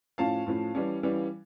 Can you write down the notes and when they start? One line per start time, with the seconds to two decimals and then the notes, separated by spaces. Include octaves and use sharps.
0.18 A2 F3 C#4 F5 A5
0.47 A2 F3 C#4
0.75 E3 G3 C#4
1.03 E3 G3 C#4